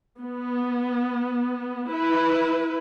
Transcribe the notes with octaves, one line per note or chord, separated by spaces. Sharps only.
B3
E4 B4